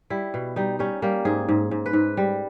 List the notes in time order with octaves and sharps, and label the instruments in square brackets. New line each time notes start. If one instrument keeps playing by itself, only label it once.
[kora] G3 E4
B2
G3 D#4
G3 C#4
G3 A#3
G#2 G#4
G#2
G#2
B4
G#2
G3